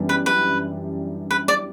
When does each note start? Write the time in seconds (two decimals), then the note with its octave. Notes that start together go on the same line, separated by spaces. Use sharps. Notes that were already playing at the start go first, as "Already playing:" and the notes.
Already playing: F#2 E3 G3 B3 D4
0.09 B4
0.26 B4
1.31 B4
1.48 D5